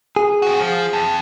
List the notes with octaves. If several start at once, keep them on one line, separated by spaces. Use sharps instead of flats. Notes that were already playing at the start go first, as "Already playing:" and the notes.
G#4
C4 F#4
F3
F2